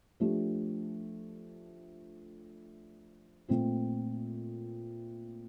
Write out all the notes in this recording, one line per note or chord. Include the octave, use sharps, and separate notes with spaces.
F3 A3 D4 G4
A#2 A3 C4 F4